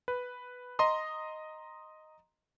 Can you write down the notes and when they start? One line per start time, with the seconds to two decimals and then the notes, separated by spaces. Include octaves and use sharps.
0.08 B4
0.79 D#5 A#5 C6 D#6